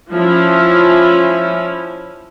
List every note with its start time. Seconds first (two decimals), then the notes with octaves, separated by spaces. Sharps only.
0.12 F3 C#4 E4